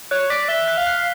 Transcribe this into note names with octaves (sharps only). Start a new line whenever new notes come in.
C#5 F#6
D5 B6
E5 G7
F#6
F5
F#6